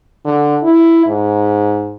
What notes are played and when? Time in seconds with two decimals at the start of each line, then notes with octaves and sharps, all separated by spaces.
0.25 D3
0.63 E4
1.07 G#2